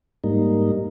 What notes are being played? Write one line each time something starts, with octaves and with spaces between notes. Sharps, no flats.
G#2 G3 A#3 D#4